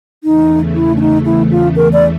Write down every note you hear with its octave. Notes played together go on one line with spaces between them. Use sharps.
E2 C#3 E3 A3 D#4
E4
D4
D#4
E4
F4
A#4
D5